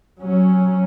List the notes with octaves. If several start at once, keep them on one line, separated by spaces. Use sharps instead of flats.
F#3 C#4